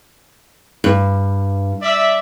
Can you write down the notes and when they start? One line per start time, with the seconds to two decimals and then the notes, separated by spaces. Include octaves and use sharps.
0.84 G2
1.83 D5 E5